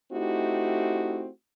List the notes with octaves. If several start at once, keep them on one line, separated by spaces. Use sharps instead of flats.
A3 C4 D#4 E4 F#4 G4